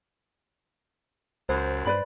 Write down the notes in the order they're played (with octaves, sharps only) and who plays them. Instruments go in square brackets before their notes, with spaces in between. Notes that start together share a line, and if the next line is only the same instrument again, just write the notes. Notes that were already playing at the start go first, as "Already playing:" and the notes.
[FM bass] C#2 [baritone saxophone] F#2 [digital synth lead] C5
[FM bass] G2 [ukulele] B4 D5 B5